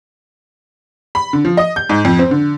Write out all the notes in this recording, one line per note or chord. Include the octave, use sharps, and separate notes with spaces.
B5
D3
F3
D#5
G6
G#2
F2
C4
D3